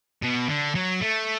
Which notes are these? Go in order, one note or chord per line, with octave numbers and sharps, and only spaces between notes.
B2
D3
F#3
A3